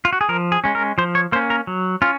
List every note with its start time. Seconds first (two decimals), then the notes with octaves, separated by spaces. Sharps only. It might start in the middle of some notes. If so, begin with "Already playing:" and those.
0.05 F4
0.13 F#4
0.21 G#4
0.29 F3 A#4
0.52 G#4
0.64 G#3 C#4
0.75 A#4
0.98 F3 C5
1.15 C#5
1.32 A#3 C#4 C5
1.50 A#4
1.67 F#3
2.02 C#4 F4